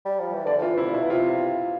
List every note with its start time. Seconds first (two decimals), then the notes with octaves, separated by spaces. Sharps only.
0.05 G3
0.19 F3
0.33 E3
0.46 D3 D5
0.58 F3
0.62 E3 F4
0.78 C3 E4
0.93 B2 E4
1.10 C3 F4